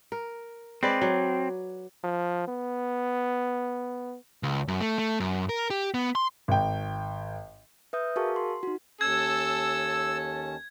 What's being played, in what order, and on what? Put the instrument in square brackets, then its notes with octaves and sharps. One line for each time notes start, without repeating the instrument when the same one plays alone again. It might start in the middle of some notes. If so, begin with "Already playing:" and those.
[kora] A#4
[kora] G#3 B4 D5 [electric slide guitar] C4
[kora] F#3
[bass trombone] F3
B3
[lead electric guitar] C#2
F#2
A3
A3
F#2
A#4
G4
B3
C6
[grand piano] G#1 G5
[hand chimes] B4 E5 D#6 G6
F#4 G#4 A#4 F5 A5 C#6
C6
D#4 F#4
[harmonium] D#2 C#4 A5 [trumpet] A4 [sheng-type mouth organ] E6 [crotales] G#6